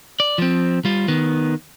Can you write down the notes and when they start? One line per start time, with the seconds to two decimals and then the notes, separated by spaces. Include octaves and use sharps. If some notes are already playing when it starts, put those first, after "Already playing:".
0.20 D5
0.38 F3 C4
0.85 G3 F4
1.08 D#3 B3